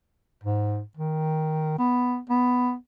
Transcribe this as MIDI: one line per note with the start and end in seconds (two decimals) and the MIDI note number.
0.44 0.81 44
0.97 1.78 51
1.79 2.19 59
2.29 2.74 59